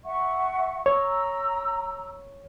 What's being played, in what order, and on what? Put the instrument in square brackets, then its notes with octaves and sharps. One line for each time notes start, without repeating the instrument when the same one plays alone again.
[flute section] E5 F#5 C#6
[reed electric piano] C#5 [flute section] A#5 E6